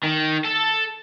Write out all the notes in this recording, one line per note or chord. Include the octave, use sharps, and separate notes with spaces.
D#3
A4